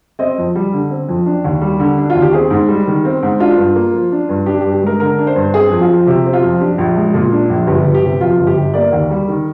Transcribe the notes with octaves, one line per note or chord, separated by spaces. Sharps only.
C4 D#5
F2
G3
D3
C4
F2
D4
D#2
G3
D3
D4
F4
D#2
G4
C4 G#4
G#2
G3
D#3
C4
G#2
D4 F4
G2
A#3
F3
D4
G2
D4 G4
G4
G2
G4
G#3 A#4
D3 A#4
D4
C5
G2
C4 G#4
F2
F4
F3
C3 G4
C4
F4
F2
D4 G4
A#1
G#3
A#2
D4
A#1
G1 G4
G1
G4
C3
F2 F4
G1
G4
G1
A#3 D5
D#2
G3
D#3